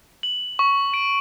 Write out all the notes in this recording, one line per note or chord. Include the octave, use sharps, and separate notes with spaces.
F#7
C#6
D7